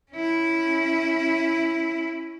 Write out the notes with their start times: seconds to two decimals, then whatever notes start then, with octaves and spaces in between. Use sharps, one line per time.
0.12 C#4 E4